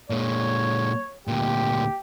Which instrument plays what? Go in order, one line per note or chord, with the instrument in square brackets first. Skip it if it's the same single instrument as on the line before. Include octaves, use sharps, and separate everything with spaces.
[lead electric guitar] A#2 G#3 [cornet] C#5
[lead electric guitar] D2 A#2 [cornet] G4